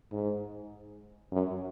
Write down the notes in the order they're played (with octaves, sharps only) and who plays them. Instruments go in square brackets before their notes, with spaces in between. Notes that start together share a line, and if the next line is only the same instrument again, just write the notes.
[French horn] G#2
F#2